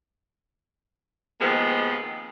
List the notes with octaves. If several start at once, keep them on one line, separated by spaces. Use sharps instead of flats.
C3 D#3 F3 G#3 A#3 B3